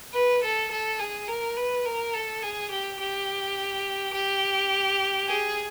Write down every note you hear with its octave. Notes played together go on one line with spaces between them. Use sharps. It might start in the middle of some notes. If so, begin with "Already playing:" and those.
B4
A4
A4
G#4
A#4
B4
A#4
A4
G#4
G4
G4
G4
G#4